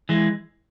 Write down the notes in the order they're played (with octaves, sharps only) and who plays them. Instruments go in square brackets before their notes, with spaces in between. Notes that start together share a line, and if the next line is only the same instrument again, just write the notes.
[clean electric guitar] E3 G#3